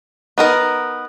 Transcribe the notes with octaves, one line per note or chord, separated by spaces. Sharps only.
B3 D#4 A#4